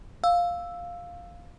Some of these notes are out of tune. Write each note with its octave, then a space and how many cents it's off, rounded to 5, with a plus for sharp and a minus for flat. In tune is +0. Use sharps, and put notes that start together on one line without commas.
F5 +5 E6 +0